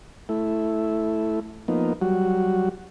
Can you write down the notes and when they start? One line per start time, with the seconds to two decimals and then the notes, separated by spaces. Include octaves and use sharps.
0.29 A3 E4
1.68 F3 A#3 B3 D#4
2.02 F#3 G3 F#4